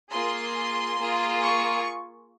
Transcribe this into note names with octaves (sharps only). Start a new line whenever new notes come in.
A#3 F4 G#4 C6
A#3 F4 G#4
C#6